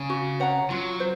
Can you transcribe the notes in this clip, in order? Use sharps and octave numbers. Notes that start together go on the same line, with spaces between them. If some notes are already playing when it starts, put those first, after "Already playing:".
Already playing: C#3
F#4
C#5 F#5 A#5
F#3 F4
C5